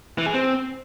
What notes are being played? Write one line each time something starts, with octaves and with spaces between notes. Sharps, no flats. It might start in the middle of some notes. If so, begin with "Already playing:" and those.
E3
G#4
C4